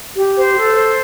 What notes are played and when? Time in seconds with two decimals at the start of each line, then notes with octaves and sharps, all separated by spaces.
0.16 G4
0.36 C5
0.56 A4
0.74 C5